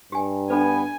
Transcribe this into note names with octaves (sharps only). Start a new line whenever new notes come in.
G2 G4 G#5
B3 D4 A4 B4 G#5